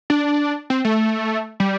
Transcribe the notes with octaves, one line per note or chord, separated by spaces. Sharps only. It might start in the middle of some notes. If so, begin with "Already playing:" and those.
D4
C4
A3
G3